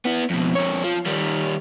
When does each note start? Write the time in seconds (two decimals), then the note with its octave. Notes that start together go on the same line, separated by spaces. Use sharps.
0.05 B3 E4
0.30 F2 B2
0.55 F2 C#5
0.84 F3
1.06 D#3 G3